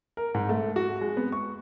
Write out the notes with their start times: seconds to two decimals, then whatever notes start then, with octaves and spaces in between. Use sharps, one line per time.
0.17 A#4
0.34 G#2
0.49 A3
0.76 F#4
1.01 G#3
1.17 B3
1.32 C#6